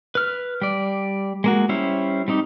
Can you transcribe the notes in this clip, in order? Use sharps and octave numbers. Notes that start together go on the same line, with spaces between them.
B4 F6
G3 D5
G#3 A#3 F#4
G3 C#4 E4 C5
G3 C4 D#4 G4